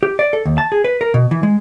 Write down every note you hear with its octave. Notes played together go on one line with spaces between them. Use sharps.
G4
D5
A4
D#2
A5
G#4
B4
A#4
B2
E3
G#3